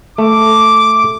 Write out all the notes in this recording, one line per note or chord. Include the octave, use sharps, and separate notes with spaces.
A3 D6